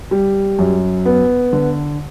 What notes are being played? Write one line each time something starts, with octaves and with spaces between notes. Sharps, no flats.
G3
F#2
B3
D3